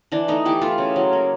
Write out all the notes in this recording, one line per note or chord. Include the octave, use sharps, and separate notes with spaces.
E3 D4
A3 D#4
E3 G4
A3 F4
C#3
F#3
A#3